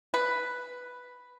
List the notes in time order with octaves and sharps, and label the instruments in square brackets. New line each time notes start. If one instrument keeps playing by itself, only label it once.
[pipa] B4